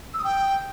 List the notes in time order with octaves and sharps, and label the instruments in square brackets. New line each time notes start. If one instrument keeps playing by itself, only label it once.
[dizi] E6
D#6
G5